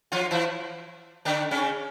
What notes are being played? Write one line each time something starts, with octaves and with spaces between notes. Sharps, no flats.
F3 F4
E3 E4
D3 D4
C#3 C#4